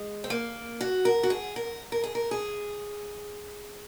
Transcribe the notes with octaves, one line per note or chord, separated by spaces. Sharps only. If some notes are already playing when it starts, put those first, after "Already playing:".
Already playing: G#3
C4
A#3
F#4
A#4
F#4
G#4
A#4
A#4
G#4
A#4
G#4